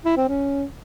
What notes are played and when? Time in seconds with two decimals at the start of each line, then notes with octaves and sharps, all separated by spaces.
0.05 E4
0.17 C4
0.29 C#4